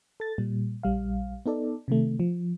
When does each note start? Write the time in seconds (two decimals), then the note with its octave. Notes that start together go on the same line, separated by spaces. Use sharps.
0.20 A4 A6
0.38 A#2 G3
0.83 A#1 G3 F5
1.46 B3 D#4 A4 D5
1.88 C3 D#3 A3
2.20 F3